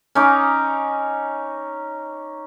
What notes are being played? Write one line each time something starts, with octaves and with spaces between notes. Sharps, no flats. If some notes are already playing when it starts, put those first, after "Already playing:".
C#4 D#4 D6